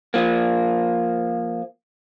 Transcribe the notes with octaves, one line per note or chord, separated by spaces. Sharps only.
F3 A#3